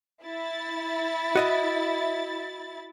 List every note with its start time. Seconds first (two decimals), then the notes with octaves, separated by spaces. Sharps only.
0.24 E4 A6
1.36 F#4 D#5 E5